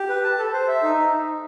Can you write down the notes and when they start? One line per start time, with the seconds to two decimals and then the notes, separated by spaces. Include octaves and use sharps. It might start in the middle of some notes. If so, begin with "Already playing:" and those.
Already playing: G4
0.09 B4
0.24 A5
0.39 A4
0.53 C5
0.68 E5
0.83 D#4